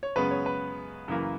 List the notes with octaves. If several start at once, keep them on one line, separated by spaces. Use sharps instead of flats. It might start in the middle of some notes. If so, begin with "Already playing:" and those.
C#5
F#2 C#3 G#3 B3 B4
C#5
B4
F#2 C#3 E3 A#3